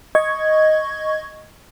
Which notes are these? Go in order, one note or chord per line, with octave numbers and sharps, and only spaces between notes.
D#5 C#6 G#6